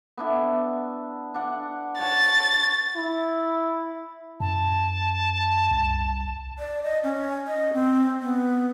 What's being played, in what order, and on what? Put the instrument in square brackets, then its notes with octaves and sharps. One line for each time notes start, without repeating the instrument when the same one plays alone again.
[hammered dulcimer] B3 D4 E4
D4 F#5
[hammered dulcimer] C#5 F#5 A5 [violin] A6
[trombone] E4
[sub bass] F#2 [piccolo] A5
[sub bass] C2
[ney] D5
D#5
C#4
D#5
C4
B3